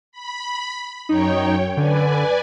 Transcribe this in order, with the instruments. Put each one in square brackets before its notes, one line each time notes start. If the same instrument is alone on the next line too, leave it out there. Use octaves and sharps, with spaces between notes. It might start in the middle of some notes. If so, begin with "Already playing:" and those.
[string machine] B5
[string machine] F#2 C#5 G5 [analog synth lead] D#4
[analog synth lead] D3 [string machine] B4 D5 G#5